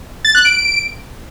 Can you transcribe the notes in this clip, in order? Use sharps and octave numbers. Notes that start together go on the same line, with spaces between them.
A6
F#6
D7